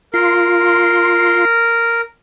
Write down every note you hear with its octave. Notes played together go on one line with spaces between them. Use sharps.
F4 A#4 C6